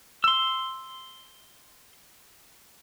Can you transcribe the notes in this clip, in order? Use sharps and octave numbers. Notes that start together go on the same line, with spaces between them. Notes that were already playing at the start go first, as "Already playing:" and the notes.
C6 E6